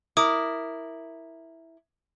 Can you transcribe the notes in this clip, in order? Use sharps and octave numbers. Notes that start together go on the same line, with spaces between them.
E4 A#4 D6 D#6